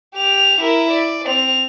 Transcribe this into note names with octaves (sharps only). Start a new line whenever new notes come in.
G4 F7
E4 A#4
D5
C4 F7